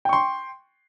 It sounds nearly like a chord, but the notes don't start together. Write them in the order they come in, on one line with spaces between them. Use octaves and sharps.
G5 C#6 C6